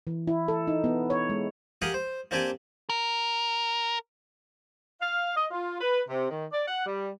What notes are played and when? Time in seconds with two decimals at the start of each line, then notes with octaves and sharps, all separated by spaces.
0.07 E3
0.27 E4
0.48 A4
0.68 D#4
0.84 B3
1.10 C#5
1.30 G#3
1.82 G4 G#4 A#4 F5 F#5 D#6
1.94 C5
2.31 A#3 C4 D4 G4 D5 G#5
2.90 A#4
5.00 F5
5.35 D#5
5.50 F4
5.80 B4
6.09 C3
6.30 D#3
6.52 D5
6.67 F#5
6.86 G3